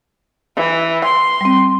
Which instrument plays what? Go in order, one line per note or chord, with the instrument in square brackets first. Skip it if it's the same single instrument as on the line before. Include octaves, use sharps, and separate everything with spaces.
[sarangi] E3
C6
[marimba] G3 C4